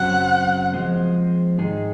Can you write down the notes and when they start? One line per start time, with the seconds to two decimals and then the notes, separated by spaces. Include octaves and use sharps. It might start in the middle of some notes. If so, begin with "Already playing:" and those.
Already playing: F#2 C#3 F#3 C4 F#5
0.73 F3 G#3 C4
1.58 G#2 D#3 G#3 D#4 G#4